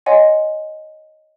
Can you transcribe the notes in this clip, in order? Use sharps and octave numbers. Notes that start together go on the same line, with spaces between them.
C#5 D#5 F#5 G#5 C6